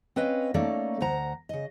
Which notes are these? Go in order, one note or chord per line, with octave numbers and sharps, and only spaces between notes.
C4 C#4 B4 D#5 F5
A3 A#3 C#4 D#4 A4 D5
D2 C5 F#5 A#5
C#3 D#5